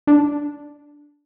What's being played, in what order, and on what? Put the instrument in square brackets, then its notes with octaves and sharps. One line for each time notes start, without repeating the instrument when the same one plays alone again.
[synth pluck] D4